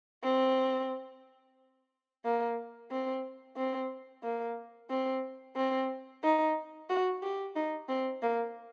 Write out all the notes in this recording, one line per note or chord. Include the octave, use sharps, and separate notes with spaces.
C4
A#3
C4
C4
A#3
C4
C4
D#4
F#4
G4
D#4
C4
A#3